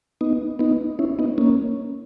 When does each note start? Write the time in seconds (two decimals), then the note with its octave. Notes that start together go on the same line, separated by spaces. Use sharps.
0.21 B3 D#4
0.59 B3 D#4
0.99 C#4 E4
1.19 B3 D#4
1.38 A#3 C#4